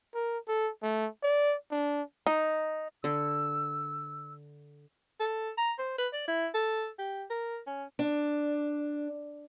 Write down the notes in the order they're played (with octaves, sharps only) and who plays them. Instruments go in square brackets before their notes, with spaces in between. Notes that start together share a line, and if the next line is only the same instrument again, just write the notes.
[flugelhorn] A#4
A4
A3
D5
D4
[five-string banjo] D#4
[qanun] D3 [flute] E6
[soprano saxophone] A4
A#5
C5
B4
D5
E4
A4
G4
A#4
C#4
[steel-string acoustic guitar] D4